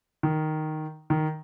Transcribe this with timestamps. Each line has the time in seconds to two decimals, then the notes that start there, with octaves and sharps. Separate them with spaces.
0.23 D#3
1.10 D#3